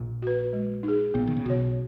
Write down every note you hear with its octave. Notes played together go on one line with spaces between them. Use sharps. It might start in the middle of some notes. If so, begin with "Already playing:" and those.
Already playing: A#1 A#2
F#4 B4
G#3
D#4
G#4
A#1 A#2 B3
D#3
C#3
B1 B2 F#4 C#5